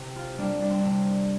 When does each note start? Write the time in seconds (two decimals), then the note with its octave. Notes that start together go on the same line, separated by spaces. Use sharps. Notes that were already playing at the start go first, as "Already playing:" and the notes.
Already playing: C3 G4
0.16 F4
0.38 G3 A#3 D4
0.62 D4
0.70 C4
0.81 C3 D4